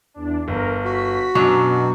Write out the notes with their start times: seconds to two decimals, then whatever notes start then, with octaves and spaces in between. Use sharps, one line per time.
0.14 E2 D4
0.48 G1 A#4
0.84 F#4 B6
1.35 F#2 B2 F#3 D4